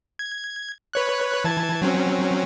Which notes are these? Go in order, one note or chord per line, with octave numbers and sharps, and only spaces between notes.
G#6
B4 C#5 F#6
E3 A5 G#6
F#3 C4 C#4